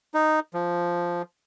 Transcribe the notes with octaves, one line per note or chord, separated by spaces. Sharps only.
D#4
F3